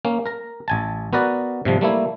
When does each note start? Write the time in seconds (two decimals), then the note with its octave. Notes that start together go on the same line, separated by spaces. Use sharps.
0.05 A#3 C#4
0.26 A#4 A#5
0.68 A1 G#5 A5
1.13 B3 F#4 A#4 B4 D5
1.65 G#2 C3 F3 G3
1.81 G3 A3 A#3 E4